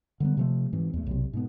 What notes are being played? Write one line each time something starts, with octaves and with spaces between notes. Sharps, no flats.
D3 G3 B3
C3 F3 A3
G#2 E3 C4
E2 A3
B1 C3
G#2 B2 B3